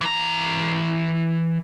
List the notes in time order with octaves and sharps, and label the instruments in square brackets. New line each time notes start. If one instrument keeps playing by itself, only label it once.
[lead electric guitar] E3 A#5